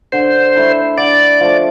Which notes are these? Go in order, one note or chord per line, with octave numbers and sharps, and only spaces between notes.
D3 C5
A3 E4 A4
D3 D5
F3 A3